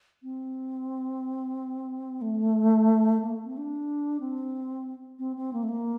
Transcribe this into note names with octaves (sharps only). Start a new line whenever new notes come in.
C4
A3
A#3
C4
D4
C4
C4
C4
A#3
A3
A#3